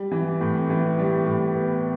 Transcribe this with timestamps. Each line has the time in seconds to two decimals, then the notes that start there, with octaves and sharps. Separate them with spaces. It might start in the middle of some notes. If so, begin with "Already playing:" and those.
Already playing: G3
0.11 E3
0.41 A2
0.70 E3
0.99 G3
1.26 A2
1.55 B3